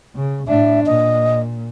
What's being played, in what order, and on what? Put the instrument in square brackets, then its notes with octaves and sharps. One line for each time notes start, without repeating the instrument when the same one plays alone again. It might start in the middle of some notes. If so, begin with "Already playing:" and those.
[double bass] C#3
[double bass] A2 D4 [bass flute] E5
[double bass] A#2 [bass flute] D#5